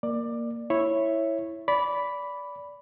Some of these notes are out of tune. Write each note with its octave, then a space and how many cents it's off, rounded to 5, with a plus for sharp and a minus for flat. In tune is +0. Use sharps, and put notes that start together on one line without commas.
A#3 +0 D5 +20
E4 +0 C#5 -10 E5 +5
D5 -20 B5 +0